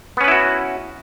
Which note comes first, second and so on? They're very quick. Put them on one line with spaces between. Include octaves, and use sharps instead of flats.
B3 C#4 B4 E4 F#4